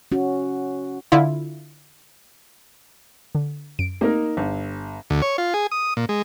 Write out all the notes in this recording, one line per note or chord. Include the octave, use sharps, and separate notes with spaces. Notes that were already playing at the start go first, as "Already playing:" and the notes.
C#4 F#4
D3 E4 F4
D3
F#2 D7
A3 A#3 C4 D#4 G4 A#4
G1
D2
C#5
F4
G#4
D#6
A#2
G#3